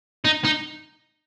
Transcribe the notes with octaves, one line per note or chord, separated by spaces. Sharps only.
D#4
D#4